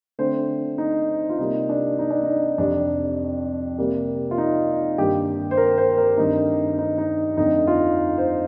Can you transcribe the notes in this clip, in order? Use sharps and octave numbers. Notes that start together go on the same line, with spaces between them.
D3 A3 C4 C5
D#4
F4
C3 G3 A#3 D#4
D4
D#4
D4
D#4
F2 C3 G3 D4
C3 G3 A#3
F4
D#4
G2 D#3 G3 A#3 G4
C5
A#4
C5
A#4
G2 D#3 A3 C4 D#4
D#4
D#4
F2 D3 A3 C4 D#4
F4
C5